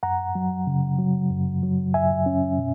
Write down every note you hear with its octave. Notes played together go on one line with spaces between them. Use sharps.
F#2 F#5 A#5
F#3
C#3
F#3
F#2
F#3
F#2 E5 G#5
C#4
B2